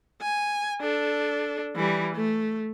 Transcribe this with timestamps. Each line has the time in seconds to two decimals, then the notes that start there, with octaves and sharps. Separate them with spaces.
0.22 G#5
0.81 D4 A4
1.75 E3 G3
2.16 A3